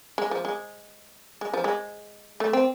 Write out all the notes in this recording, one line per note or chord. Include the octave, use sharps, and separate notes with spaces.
G#3
F3
G#3
G#3
F3
G#3
A3
C4